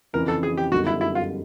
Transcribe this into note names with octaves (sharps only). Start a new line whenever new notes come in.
F2 C#3 E3 A#4
A4
G#4
G4
F#2 D3 G3 B3 D#4 F#4
E4
E4
F4